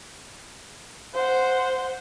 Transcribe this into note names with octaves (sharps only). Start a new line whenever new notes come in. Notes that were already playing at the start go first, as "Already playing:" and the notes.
C5 F#5